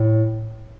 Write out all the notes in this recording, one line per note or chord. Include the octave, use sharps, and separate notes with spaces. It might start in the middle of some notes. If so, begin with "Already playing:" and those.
Already playing: A2